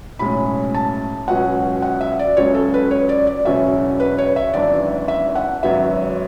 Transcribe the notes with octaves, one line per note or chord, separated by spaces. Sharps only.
B1 A2 G#3 C#4 B5
A5
C#2 B2 F#3 C#4 F#5
F#5
E5
D5
C#2 C#3 F#3 C#4 C#5
A4
B4
C#5
D5
D5
E1 E2 C#3 F#3 C#4 E5
B4
C#5
E5
G#1 F#2 E3 B3 D4 D5
E5
F#5
G#1 F#2 C#3 F#3 B3 E5